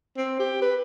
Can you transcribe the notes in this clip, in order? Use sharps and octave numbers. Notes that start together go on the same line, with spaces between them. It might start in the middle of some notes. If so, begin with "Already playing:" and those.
C4
G4
B4